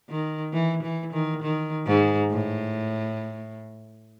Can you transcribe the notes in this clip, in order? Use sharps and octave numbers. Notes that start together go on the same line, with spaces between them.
D#3
E3
E3
D#3
D#3
G#2
A2